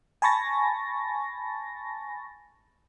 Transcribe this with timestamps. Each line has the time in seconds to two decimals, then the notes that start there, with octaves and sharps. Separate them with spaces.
0.22 G#5 A5 B5 C#6 A6 A#6